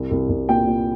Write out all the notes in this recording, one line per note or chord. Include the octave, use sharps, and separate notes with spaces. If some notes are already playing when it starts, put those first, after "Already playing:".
Already playing: C2
C2
C2
A#2 G5
A#2